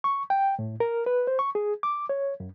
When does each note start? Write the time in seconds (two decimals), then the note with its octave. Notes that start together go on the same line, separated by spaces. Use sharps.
0.04 C#6
0.30 G5
0.59 A2
0.80 A#4
1.06 B4
1.27 C5
1.39 C#6
1.55 G#4
1.83 D6
2.09 C#5
2.40 F#2